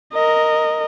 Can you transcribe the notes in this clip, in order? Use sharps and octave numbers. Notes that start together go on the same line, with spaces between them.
A#4 D#5